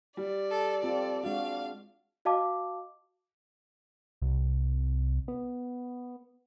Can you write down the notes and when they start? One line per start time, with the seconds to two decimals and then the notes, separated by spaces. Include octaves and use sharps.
0.17 G3 D5
0.51 A4
0.83 C4 F4 A4
1.24 G#3 D4 F#4 F5
2.25 F#4 D#5 F5 A5 D6
4.22 C2
5.28 B3